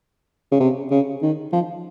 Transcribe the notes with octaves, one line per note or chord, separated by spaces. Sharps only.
C#3
C3
C#3
D#3
F3